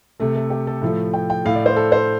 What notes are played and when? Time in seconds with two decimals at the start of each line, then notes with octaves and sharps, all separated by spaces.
0.20 C3 A3 A4
0.36 A4
0.50 G4
0.67 A4
0.82 A2 F3 A3
1.14 G5
1.30 G5
1.45 A2 A3 F5
1.55 D5
1.66 C5
1.76 A4
1.92 C5